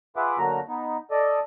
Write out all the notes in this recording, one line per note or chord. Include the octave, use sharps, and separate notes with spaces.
F4 G#4 B4 E5 F#5 D6
D3 F#3 A3 A#3 F#4 A#5
B3 D#4
A4 D5 D#5